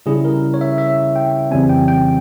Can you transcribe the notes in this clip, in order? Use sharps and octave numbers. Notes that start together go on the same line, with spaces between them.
C#3 G3 C#4 E4 G#4
A#4
C#5
E5
E5
G5
F2 C#3 E3 G3 C4 G#5
G5
G5